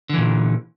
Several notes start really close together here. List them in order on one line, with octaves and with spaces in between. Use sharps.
D3 E3 A#2